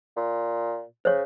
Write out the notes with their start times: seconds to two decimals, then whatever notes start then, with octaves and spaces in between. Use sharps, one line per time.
0.17 A#2
1.05 C#3 C5 C#5